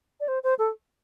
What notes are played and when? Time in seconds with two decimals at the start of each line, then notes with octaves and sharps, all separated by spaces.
0.20 D5
0.28 C5
0.43 C5
0.59 A4